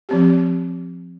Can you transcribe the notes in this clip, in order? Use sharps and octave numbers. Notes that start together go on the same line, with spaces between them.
F3 C4 G4